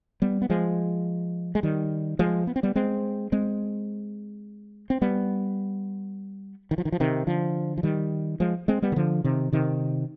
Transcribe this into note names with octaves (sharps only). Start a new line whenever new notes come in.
G3 B3
B3
F3 G#3
G#3
D#3 G3
F3 G#3
B3
C4
G3 B3
G#3 C4
G#3 C4
C4
G3 B3
D#3
F3
D#3
F3
C3 D#3
D3 F3
F3
D#3 G3
F3 G#3
G#3 C4
G3 B3
D#3
D3 F3
C3 D#3
C3 D#3